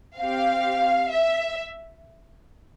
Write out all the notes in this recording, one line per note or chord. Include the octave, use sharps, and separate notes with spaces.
C4 G4 F5
E5